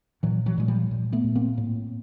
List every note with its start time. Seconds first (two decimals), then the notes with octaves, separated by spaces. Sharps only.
0.23 A#2 E3 F#3
0.46 E3 F#3
0.58 A#2 G#3
0.68 F3 G3
0.91 A#2
1.12 A3 B3
1.24 A#2
1.35 A#3 C4
1.58 A2